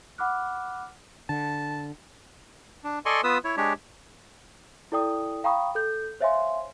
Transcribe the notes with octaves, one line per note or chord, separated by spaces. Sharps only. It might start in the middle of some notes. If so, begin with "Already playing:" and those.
F#5 B5 D6 F6 F#6
D3 A5
D4
A4 D5 D#5 G#5 C6 C#6
B3 F4 B4 D#6 E6
E4 C#5
G#3 D4 G4 C#5
E4 A4 D5 G5 D#6
F5 G5 A#5 B5 C#6 D#6
A4 G6
C5 C#5 E5 F5 G#5 C6